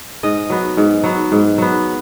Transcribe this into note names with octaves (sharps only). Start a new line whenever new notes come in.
G#2 D#5
F#3 B3
G#2
F#3 B3
G#2
F#3 B3